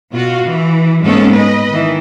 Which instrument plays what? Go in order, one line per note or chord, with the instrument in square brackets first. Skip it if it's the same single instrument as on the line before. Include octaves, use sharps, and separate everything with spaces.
[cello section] B2 F4 F#4
E3
G#2 G#3 A#3 B3 C#4 A4
B4 D#5
D#3 E3